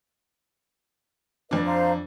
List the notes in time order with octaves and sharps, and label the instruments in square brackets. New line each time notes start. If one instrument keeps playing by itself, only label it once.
[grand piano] F2 D4 [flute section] B4 D#5
[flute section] C5 F5 A#5